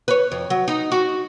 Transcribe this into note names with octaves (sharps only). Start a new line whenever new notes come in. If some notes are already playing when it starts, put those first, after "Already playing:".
B4 C#5
F2
F#3
D#4
F#4